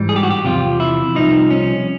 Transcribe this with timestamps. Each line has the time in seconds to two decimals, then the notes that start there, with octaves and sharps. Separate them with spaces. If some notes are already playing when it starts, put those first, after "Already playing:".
Already playing: G#2 E3 G3
0.09 G#4
0.16 G4
0.23 F#4
0.31 G4
0.44 E2 C3 F3 F4
0.80 E4
1.15 C2 C3 F3 D#4
1.51 C#4